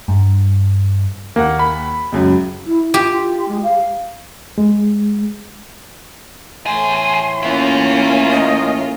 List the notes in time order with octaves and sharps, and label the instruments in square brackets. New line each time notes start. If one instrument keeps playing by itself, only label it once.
[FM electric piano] G2
[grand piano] D#2 F#5 [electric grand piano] A#3
[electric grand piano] B5
[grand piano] C#2 F#2 F#3
[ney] E4
[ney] F4 [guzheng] G4
[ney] F4
G#3
F5
[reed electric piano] G#3
[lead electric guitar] E2 G#4 [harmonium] A2 E3 A3 [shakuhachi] C6
[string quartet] A#3 C#4 F4 [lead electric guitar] B3 E4
[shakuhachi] D#5